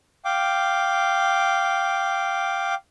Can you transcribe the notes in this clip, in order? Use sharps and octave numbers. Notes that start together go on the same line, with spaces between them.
F5 G5 D6